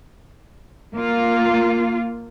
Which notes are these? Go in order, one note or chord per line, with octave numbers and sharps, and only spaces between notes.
A#3 F4